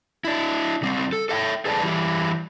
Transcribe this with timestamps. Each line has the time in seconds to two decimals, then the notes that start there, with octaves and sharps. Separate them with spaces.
0.24 D4 E4
0.82 C#3 G3 C4
1.12 A4
1.29 A4 E5 F#5 G5
1.65 G#4 A4 B4 D5 G#5 A5
1.83 E3 G3 E4